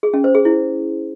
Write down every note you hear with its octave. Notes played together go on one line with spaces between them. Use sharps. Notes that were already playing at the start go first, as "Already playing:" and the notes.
G#4
C#4
C5
G#4
E4